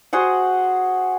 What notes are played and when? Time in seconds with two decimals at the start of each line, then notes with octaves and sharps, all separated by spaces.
0.13 F#4 G#4 C5 F#5